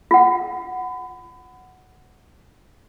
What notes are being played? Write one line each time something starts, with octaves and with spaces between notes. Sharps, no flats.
F4 F#5